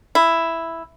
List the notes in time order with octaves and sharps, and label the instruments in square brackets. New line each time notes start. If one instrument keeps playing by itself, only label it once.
[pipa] E4